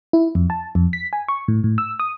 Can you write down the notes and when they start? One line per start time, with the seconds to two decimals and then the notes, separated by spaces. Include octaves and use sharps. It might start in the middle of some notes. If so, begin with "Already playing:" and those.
0.13 E4
0.35 F2
0.50 A5
0.75 F2
0.93 B6
1.13 G#5
1.28 C#6
1.48 A2
1.64 A2
1.78 E6
2.00 D#6